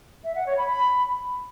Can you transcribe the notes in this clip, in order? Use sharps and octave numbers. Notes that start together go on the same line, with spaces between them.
E5
F#5
C#5
B5
B5